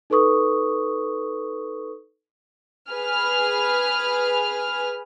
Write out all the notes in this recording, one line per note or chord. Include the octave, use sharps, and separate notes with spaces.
D#4 A4 B4 C#6 D#6
G#4 B4 F6